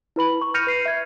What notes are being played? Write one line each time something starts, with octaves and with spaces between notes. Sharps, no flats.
E4 B4 B5 F#7
C#6
F6 G6 A#6 C#7 D#7 F7
B4 C7 D#7
E5 G#6